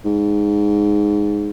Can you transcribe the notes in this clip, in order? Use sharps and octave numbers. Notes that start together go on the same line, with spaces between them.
G#2